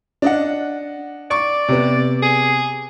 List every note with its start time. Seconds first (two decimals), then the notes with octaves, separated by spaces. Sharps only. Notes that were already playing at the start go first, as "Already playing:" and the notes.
0.22 D4 D#5 F#5
1.31 D5 C#6
1.68 C3 B3
2.23 G#4